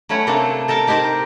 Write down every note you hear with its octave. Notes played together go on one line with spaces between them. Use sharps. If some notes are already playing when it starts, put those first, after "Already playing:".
F#3 A3 C#4 B4 C#5 F#5
C3 A3 A#3 C4 D4 A4
A4 A#4 G5 A5
D#4 G4 A#4 C5 D5